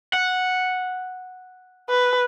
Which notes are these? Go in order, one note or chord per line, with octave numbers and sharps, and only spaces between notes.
F#5
B4